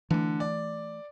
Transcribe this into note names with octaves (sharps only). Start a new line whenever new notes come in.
D3 E3 A3
D5